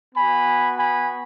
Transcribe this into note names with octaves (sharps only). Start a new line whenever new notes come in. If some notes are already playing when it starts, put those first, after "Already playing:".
B3 F#4 G#5 B5
G#5 B5